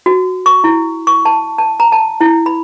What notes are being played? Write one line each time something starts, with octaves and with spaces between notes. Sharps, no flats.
F#4
C#6
E4
C#6
A5
A5
A#5
A5
E4
B5